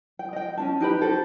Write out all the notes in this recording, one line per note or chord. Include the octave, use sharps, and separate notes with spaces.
G5
D#5 G5
C#4 D4 A5
D#4 G4 B4 B5
F#4 G4 A4 C5